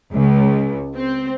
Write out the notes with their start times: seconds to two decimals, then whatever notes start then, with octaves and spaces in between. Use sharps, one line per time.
0.12 C#2
0.96 C4